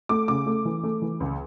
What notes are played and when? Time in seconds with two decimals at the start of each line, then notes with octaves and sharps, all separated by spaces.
0.09 A3 D6
0.28 C#3 D6
0.46 A3
0.65 E3
0.83 A3
1.02 E3
1.20 C#2